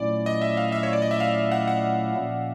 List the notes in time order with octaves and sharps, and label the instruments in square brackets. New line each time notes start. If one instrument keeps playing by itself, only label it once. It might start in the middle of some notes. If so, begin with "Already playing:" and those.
Already playing: [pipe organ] A#2 F#3 A3 C#4 E4 [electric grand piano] D5
[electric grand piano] D#5
E5
F5
E5
C#5
D5
D#5
E5
F5
F#5
F#5
[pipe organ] A#2 F3 A#3 C#4